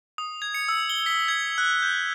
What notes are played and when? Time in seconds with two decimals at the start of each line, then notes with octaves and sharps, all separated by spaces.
0.18 D#6
0.42 G#6
0.54 C#7
0.68 E6
0.89 G7
1.06 B6
1.28 G#6
1.58 F#6
1.82 G6